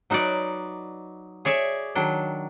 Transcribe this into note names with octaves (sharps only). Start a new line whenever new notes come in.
F#3 D#4 F#4 B4 D5
G#4 C#5 D5 E5
D#3 F#3 D4 G5